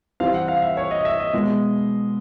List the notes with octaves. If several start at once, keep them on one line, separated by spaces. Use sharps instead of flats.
E3 G3 C4 F5
F#5
F5
E5
C#5
D#5
E5
D#5
B2 G#3 B3